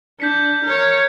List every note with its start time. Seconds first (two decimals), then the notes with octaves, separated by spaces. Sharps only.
0.20 D4 G6 B6 C#7
0.64 A#4 C#5